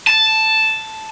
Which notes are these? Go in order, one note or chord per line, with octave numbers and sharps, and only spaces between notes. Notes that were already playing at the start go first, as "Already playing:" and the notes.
A5